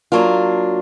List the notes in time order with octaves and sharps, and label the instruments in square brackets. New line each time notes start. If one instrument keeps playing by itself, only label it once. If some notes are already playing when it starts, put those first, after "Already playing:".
[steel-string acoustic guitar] F#3 A#3 D4 F4